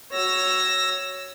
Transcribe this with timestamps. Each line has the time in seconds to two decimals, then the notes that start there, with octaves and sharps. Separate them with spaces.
0.12 F#4 C#5 E6 A#6